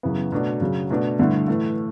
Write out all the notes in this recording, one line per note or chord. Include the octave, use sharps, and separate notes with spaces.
F#2 C#3 E3 B3
B2 F#3 A3 D4
F#2 C#3 F#3
B2 A3 D4
G2 D3 A3 E4
A2 E3 A3